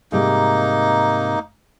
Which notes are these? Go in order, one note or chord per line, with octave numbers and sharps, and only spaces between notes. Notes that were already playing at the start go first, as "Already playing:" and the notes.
G#2 C3 G3 A#3 D#4